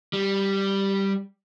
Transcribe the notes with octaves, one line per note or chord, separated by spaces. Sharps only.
G3